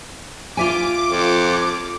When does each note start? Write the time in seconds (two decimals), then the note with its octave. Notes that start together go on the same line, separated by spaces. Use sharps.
0.57 F4 E5 G#5 D6
1.08 F2